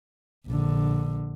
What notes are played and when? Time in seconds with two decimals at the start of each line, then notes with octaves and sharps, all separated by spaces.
0.47 A#1 D3